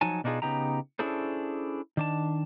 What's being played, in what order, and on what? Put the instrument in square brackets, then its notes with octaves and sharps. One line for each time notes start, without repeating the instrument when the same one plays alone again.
[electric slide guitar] F3 F#3 D#4 G#5 A5
B2 D4 D#4 F4 G#4
C#3 B3 D#4 G4 A#5
C#4 D4 E4 G#4 A4 C5
D#3 D4 A5